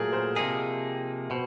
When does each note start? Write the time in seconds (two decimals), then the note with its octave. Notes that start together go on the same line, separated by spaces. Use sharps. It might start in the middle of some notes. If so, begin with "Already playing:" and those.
Already playing: A#2 F#3 A3 G#4 A#4
0.12 A#4 C5
0.36 C3 F3 A#3 D#4 G#4
1.31 B2 C5